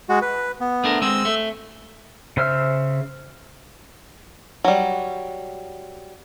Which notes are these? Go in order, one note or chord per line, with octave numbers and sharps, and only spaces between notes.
G#3 F#4
B4
B3
A3 D4 A#4
G#3 C4 E6
A3
C#3 C5 E5 F6
F#3 G3